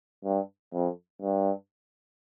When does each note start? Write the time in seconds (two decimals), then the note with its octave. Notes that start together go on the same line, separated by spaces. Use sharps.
0.25 G2
0.73 F2
1.22 G2